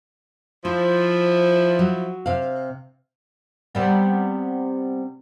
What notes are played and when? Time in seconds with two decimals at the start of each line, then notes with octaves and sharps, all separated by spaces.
0.65 F3 E4 C5
1.79 F#3
2.26 C3 F5
3.75 C3 G3 B3